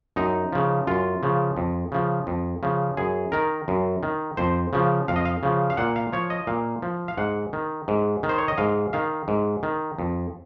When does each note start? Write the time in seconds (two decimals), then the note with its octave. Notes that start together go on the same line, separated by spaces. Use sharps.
0.16 F#2 D#4
0.53 C#3 F3
0.87 F#2 F4
1.23 C#3 F3
1.57 F2
1.92 C#3 F3
2.27 F2
2.63 C#3 F3
2.97 F#2 G#4
3.32 D#3 A#4
3.68 F#2
4.03 D#3
4.37 F2 C5
4.73 C#3 F3
5.08 F2 F5
5.16 D#5
5.25 F5
5.43 C#3 F3
5.70 F5
5.77 A#2 F#5
5.96 F5
6.13 F3 C#5
6.30 D#5
6.47 A#2 F5
6.82 F3
7.08 F5
7.17 G#2 F#5
7.53 D#3
7.88 G#2
8.23 D#3
8.29 C5
8.38 C#5
8.48 D#5
8.58 G#2 F5
8.93 D#3 F5
9.28 G#2
9.63 D#3
9.99 F2